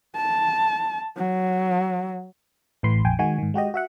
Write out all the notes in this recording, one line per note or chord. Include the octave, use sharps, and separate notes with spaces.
A5
F#3
A1 A2 E3 B5 C6
A#1 F2 G5 G#5
D#3 G#3 F#4 G#5
G#2 D#3
G#3 F#4 G4 D#5
F#4 E5 F#5